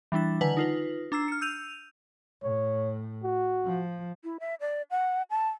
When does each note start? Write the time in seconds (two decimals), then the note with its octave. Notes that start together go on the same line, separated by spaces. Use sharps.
0.12 E3 G3 D4 E4 A6
0.41 D3 D#3 B4 F#5 G#5 F#7
0.57 D#4 F4 B4
1.12 D4 A#5 E6 C7
1.28 F6 C#7
1.41 E6 G6 D#7 F7
2.43 A2 C#5
3.23 F#4
3.65 F3
4.23 E4
4.40 E5
4.60 D5
4.91 F#5
5.30 A5